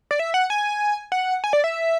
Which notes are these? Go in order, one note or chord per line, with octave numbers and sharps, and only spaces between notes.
D5
E5
F#5
G#5
F#5
G#5
D5
E5